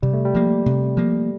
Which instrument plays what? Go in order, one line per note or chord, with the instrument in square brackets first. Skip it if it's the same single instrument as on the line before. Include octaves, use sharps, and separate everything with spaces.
[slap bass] C3 [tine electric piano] G3
[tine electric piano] A3
G3
[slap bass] F3 A#3
C3
F3 A#3